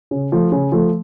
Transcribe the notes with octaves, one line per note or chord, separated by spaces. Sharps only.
C#3
F3 A3
C#3
F3 A3